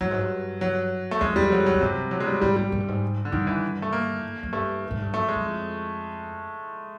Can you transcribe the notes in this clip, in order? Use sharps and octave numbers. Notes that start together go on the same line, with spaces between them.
G2 F#3
G#2
G2
F#3
A3
F2 G#3
E2 G3
F2
F#3
F#3
F#2
G2 C3
F#3
G#3
G3
G#2 G3
G3
G#2
G2
G#2
D3
G2 D#3
E3
A3
A#3
F#2
G2 A3
G#2
G2
F#2 A3
G#3
F#2
F2